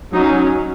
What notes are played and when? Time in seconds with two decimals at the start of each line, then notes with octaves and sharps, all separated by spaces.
0.13 F#3 C#4 D#4